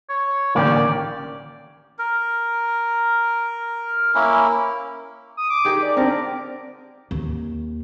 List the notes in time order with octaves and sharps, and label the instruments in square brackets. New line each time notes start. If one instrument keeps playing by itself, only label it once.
[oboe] C#5
[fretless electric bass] A1 D3 D#3 [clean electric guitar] A#3 C#4 G4 [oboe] D5
[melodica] A#4
A#3 C#4 E4
[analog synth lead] D#6
D6
[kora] D#3 G4 G#4
[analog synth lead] D5
[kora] D3 A#4 [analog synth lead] C4
[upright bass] D#2